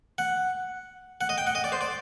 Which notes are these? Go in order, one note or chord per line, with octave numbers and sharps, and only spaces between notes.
F#5
F#5
D#5
G5
F#5
D#5
D5
C5
D5